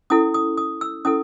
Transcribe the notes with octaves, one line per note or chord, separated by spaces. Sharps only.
C#4 E4 A4 D#6
D#6
D#6
E6
C#4 E4 A4 D#6